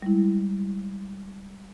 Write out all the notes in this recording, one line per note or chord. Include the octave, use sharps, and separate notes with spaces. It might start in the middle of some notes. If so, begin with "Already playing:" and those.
G3 G#3 E4